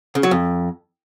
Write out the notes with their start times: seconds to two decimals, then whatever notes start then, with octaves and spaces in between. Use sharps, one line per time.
0.15 C#3
0.23 F#3
0.31 F2